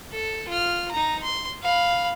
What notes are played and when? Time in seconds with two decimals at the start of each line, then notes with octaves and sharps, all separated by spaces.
0.12 A4
0.48 F4 F6
0.91 D#4 A#5
1.23 C6
1.62 F5 B5